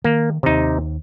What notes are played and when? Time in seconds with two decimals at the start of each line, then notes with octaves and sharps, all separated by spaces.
0.04 D#3 A#3
0.43 D#2 C3 D#3 D#4